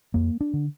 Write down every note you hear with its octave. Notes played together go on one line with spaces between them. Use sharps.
F2 A#3
D4
D3